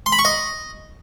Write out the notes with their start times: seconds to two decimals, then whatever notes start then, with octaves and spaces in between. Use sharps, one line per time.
0.06 C6
0.12 B5
0.19 C#6
0.25 D#5